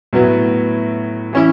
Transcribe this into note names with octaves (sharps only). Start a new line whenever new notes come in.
A2 F#3 B3 E4
E3 C#4 E4